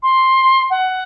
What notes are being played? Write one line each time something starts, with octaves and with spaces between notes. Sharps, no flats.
C6
F#5